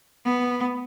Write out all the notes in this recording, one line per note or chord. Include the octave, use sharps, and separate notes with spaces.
B3